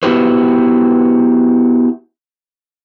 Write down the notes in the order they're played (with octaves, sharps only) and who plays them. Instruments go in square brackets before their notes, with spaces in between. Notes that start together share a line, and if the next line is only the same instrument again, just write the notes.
[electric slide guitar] B3 E4 F#4 G4 B4 C5